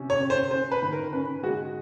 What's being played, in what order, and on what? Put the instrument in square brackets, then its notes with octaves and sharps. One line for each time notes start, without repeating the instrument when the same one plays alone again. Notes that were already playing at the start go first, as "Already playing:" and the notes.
Already playing: [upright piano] C3 C#4
[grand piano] C#5
[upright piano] C#4
[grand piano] C5
[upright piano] C#4 [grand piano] C5
[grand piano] B4
[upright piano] D#3
[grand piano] A#4
[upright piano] C#4 [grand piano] B4
[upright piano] G#3 [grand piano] F#4